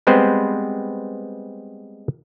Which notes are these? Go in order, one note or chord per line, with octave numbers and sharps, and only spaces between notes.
G3 G#3 B3 C4 B4 C5